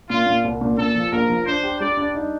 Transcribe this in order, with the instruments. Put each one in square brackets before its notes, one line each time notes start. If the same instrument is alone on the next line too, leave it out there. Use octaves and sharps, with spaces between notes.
[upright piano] A#2 [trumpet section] F4
[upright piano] A#2
C2
A#2
[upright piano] A#2 [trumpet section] A4
[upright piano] F3
[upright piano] A#1 [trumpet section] A#4
[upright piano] F3
[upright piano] D4 [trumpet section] C5
[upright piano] G4
[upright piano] G3 [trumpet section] D5
[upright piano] D4
D#4